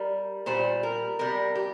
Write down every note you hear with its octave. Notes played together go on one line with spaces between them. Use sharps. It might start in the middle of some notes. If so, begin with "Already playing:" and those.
Already playing: G3 A#4
A#2 G3 C5
A#4
C3 G3 A#4
G4